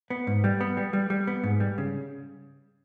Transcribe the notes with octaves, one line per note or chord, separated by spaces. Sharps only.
B3
G#2
G3
B3
G3
G3
G3
B3
G#2
G3
C#3